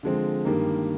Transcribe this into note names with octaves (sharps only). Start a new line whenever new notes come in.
D3 F3 G#3 C4
G2 D#3 G3 A#3